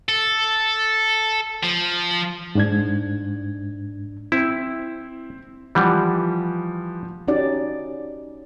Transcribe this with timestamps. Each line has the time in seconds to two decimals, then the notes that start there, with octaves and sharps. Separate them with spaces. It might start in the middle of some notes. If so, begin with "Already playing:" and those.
0.09 A4
1.63 F3
2.55 G#2 D4 G#6
4.32 C4 E4
5.75 E3 F3 G3 F#5
7.28 C#4 D#4 F#4 G4 D5